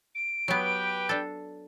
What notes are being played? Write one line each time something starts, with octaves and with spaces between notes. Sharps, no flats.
D7
F#3 B3 G4 B4 G5
D4 A4